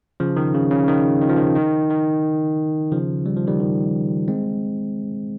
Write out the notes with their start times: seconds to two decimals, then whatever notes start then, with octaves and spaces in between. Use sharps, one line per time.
0.20 C#3 F3
0.37 D#3
0.54 C#3
0.71 C#3
0.88 D#3
1.22 D#3
1.29 F3
1.38 D#3
1.56 D#3
1.90 D#3
2.92 C#3 F3
3.26 G3
3.36 F3
3.47 D#3 G3
3.60 D#3
4.28 G#3 C4